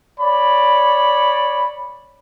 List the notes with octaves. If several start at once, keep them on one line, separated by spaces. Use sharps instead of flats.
C#5 D5 B5